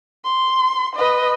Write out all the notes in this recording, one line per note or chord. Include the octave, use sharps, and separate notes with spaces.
C6
B4 D#5